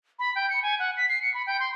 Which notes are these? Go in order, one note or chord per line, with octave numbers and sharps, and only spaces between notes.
B5
G5
C#7
G#5
F#5
B6
C7
C#7
B5
G5
C6